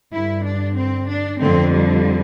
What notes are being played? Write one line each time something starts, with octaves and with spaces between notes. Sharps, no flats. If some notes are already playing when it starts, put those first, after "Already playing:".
G2 D3 E4
D4
C4
D4
F2 D3 C4
G3